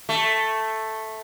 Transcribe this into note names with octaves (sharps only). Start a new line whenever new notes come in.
A3